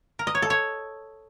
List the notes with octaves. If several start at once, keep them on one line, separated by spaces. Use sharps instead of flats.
A#4
D#5
C#5
A4
C#5